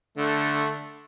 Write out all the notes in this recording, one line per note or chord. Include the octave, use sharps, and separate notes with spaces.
D3 A3